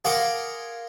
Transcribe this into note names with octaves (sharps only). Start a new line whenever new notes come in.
G#4 A#4 F5 F#5 C6 D6